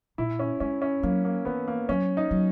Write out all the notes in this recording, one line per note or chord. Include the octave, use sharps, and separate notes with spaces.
A#2 E4
C#4
G#3 C#4
C#4
F#3 A#3
A#3
E3 B3
A#3
F#3 C#4
D#4
F#3